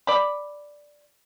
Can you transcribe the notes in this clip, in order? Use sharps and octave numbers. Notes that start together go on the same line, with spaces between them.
D5 B5